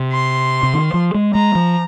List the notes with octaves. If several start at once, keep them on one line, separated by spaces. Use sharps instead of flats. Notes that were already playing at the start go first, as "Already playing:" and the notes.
Already playing: C3
C6
C3
D#3
F3
G#3
G#3 A#5
F3